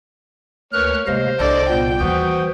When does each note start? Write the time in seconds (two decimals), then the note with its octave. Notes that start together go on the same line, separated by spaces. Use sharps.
0.73 D2 A#3 B4 C#5 F6 F#6
1.07 C3 G#3 A#3 C5 D#5 F5
1.40 C2 D4 A4 D5 D#5
1.69 A#2 G3 B3 G5
2.01 D#2 E3 G3 F#4 C5 D#6